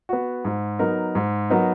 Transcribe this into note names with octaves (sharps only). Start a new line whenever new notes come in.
B3 F#4
G#2
F#3 B3 D#4 A#4
G#2
F#3 B3 D#4 A#4